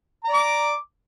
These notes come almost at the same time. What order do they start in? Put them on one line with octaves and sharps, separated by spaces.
A#5 D5 D6